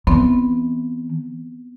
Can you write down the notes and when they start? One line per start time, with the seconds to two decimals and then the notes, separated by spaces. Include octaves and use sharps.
0.07 E3 B3 C4